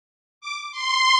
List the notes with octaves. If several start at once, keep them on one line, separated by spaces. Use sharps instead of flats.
D6
C6